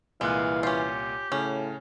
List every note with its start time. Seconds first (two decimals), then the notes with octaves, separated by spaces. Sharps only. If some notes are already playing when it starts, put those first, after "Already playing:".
0.21 C2 A#2 E3 G#3 F5 F#6
0.63 C#4 F4 G4
1.32 A2 C#3 C#4